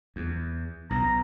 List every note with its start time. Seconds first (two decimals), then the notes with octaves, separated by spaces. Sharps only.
0.16 E2
0.90 B1 B2 A#5